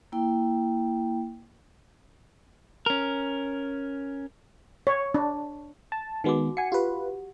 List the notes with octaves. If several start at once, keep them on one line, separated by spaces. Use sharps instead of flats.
A#3 E4 G5
C#4 A#4
C#5
D4
A5
D#3 G#3 B3 D#4 F#4 D6
F#5 G#5 C#7
F4 G4 B4